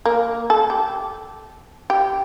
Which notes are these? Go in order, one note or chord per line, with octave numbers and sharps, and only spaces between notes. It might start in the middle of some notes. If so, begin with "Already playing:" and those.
A#3
A4
G4
G4